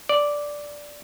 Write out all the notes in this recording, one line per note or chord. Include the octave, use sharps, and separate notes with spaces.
D5